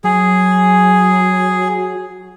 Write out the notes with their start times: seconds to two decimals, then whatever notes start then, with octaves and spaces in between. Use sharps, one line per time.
0.04 F#3 G#4